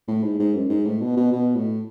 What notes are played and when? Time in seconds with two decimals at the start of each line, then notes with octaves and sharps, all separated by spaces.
0.08 A2
0.23 G#2
0.39 G#2
0.55 F#2
0.70 G#2
0.86 A2
1.01 B2
1.17 B2
1.32 B2
1.56 A2